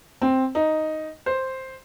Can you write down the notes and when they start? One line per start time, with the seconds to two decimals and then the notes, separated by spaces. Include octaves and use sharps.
0.22 C4
0.55 D#4
1.26 C5